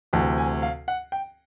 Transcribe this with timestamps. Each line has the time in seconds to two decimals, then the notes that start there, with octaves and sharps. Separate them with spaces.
0.13 D2 C3 E3 A5
0.38 G#5
0.62 F5
0.88 F#5
1.12 G5